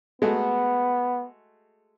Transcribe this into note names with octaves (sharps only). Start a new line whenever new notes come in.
G#3 A3 B3 F#4